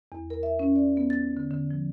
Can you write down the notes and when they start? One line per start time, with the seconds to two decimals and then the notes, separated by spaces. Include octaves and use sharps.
0.12 E2
0.30 A#4
0.43 E5
0.59 C#4
0.76 D5
0.97 B3
1.10 A6
1.37 D3
1.51 D3
1.71 F3